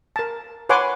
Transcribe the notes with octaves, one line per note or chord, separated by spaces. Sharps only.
A#4 A5
B4 C#5 F#5 G#5 C6 D6